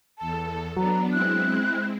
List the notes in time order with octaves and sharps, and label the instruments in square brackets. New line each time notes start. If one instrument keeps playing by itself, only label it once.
[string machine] E2 A4 [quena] A5
[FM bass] F#3 [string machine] B3 D4 [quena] A#5
[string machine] G#3 C4 E4 [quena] F#6